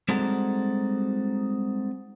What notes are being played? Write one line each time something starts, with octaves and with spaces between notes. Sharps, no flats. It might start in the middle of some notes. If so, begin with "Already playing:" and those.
G3 G#3 C4 D#4 F#4 A4